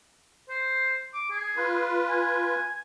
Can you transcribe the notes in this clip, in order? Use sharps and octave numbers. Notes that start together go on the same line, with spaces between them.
C5
D6
G#4
F4 B4
G#5